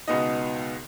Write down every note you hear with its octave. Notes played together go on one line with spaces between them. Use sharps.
C#2 B2 B3 D#4 D#5